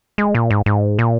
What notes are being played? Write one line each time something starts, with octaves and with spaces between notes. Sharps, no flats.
G#3
A#2
G#2
G#2
A#2